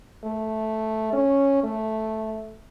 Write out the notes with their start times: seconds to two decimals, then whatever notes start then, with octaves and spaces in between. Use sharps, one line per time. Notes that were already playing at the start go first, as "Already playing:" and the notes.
0.24 A3
1.13 C#4
1.64 A3